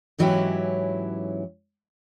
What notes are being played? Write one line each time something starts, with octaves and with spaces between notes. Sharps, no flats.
G#2 E3 F#3 C#4 E4 G4